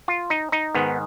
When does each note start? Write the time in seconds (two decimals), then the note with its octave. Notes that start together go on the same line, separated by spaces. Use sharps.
0.08 F4
0.30 D#4
0.52 D#4
0.75 G#2 D#3 B3